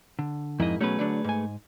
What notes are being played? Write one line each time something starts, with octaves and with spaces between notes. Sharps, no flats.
D3
F2 G#2 A#3 E4 D#5
B2 F#3 A3 C#4 G#4 B4
D3 F#3 D4
G#2 G#5